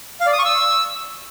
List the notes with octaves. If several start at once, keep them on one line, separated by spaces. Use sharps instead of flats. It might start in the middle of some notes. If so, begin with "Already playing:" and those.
F5
D5
D#6
C#6
E6